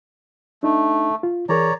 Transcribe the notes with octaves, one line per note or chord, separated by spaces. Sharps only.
A3 D4 D#4
F4
E3 G#4 A#4 C#5 D5 A#5